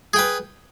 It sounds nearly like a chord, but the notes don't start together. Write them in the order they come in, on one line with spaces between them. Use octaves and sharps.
G#4 G5 B4